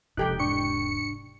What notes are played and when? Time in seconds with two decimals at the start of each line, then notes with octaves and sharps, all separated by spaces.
0.17 E1 C3 F3 D#4 G4 A4 G5 F#6
0.39 G#2 D4 C#6 C#7